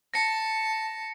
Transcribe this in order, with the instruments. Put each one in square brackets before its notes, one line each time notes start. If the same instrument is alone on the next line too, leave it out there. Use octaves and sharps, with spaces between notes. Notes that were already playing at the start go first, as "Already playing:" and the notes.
[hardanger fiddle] A5 [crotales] A#6 C#7